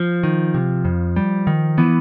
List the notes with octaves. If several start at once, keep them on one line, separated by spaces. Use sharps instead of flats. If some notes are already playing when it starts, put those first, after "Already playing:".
Already playing: F3
D#3
C3
F2
G3
D#3
E3 B3